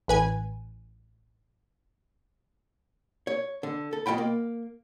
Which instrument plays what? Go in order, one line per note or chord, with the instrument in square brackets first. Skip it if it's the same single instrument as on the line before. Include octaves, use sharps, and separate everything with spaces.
[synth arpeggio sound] A1 B4 G#5
[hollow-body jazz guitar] C#5
D3
A4
B2 A3 F4 G5 B5
A#3